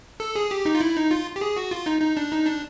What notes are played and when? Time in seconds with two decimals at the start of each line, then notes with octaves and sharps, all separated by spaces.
0.20 A4
0.36 G#4
0.51 G4
0.65 D#4
0.75 F4
0.81 E4
0.96 D#4
1.11 F4
1.36 G4
1.41 G#4
1.56 F#4
1.71 F4
1.86 D#4
2.01 D#4
2.17 D4
2.32 D#4
2.46 D4